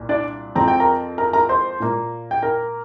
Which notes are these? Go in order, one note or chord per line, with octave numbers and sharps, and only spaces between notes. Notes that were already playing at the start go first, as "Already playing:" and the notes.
Already playing: C2 A#2
D4 D5
F2 F3 C4 A#5
G5
A#4 A#5
A#4 A#5
A#4 A#5
C5 C6
A#2 A#3
G5
A#4 A#5